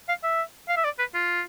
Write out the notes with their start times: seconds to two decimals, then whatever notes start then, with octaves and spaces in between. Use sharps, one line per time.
0.08 F5
0.23 E5
0.69 F5
0.77 E5
0.84 D5
0.99 B4
1.14 F4